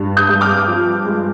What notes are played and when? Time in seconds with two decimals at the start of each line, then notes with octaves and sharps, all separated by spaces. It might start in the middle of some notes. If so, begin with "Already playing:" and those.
Already playing: G2
0.17 D#6 G6
0.29 G2
0.41 D6 F6
0.68 F3
1.05 G#3